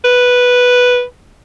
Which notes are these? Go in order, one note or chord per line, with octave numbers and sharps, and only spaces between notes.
B4